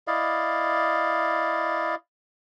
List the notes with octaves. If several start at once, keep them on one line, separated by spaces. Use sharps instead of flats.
E4 D5 D#5 F5